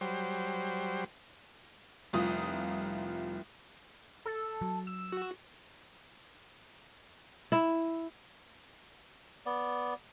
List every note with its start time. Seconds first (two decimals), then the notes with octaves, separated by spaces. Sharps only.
0.01 F#3 G3 C5
2.13 F1 C2 F4 D#6
4.26 A4
4.62 F#3
4.87 E6
5.12 F#4
7.52 E4
9.46 B3 D5